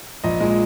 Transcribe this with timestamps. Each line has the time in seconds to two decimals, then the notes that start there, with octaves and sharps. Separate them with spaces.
0.24 A#1 D#5
0.40 A#2 F3 G#3